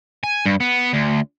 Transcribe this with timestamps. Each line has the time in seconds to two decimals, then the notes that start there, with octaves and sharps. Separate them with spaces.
0.24 G#5
0.46 G2
0.60 B3
0.94 D2